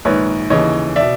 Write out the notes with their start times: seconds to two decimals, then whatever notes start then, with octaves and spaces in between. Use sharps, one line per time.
0.05 A#1 G#2 D#3 B4 C#5
0.50 D#2 C#3 E3 C#5 D#5
0.96 B2 D5 E5